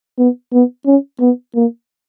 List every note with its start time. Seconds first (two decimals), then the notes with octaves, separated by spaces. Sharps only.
0.18 B3
0.53 B3
0.86 C#4
1.20 B3
1.55 A#3